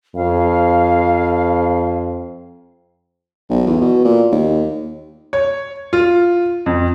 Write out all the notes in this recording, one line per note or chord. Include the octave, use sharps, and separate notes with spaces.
F2 F5
B1
E2
B2
A#2
D#2
C#5
F4
F2